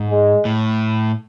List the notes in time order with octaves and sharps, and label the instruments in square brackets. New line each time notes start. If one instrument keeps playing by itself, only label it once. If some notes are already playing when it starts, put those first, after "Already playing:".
Already playing: [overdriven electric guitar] G#2
[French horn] G#3
[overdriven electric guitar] A2